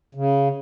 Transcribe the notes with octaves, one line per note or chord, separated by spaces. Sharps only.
C#3